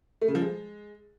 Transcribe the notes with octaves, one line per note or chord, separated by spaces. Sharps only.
A3
C#3
F3
G#3